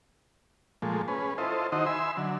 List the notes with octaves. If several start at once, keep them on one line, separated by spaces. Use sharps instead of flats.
A#2 F3 G#3 A3
C#4 G#4 B4
E4 F4 A4 C5 D#5
D#3 D#4 E4 F#4 C5 D#5
E5 G#5 B5 C6 E6
D3 F#3